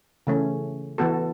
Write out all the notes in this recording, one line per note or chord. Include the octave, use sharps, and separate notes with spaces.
C#3 E3 A3 C#4
E3 B3 F#4 A4